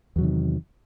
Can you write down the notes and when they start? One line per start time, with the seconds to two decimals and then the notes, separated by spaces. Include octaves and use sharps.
0.16 E2
0.18 F#3
0.21 C3
0.24 D#3